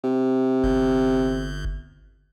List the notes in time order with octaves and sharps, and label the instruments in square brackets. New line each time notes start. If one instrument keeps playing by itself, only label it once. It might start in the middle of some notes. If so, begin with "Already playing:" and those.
[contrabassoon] C3
[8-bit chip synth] G1